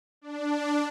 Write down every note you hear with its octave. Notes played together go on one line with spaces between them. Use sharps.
D4